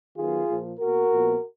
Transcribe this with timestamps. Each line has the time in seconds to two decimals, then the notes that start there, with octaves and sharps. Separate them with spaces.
0.17 D#3 F#3 B3 F4 G#4
0.49 A#2 F3 A#3
0.80 B2 A#3 F#4 A#4
1.11 A#2 F3 B3